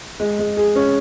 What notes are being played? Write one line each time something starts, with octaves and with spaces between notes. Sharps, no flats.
G#3
G#3
G#4
C#4